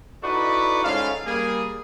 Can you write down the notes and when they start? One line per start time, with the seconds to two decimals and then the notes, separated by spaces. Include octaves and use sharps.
0.23 D#4 E4 F#4 A4 B4 D5
0.84 G#2 C#4 F4 A4 F5
1.26 G3 A#3 G#4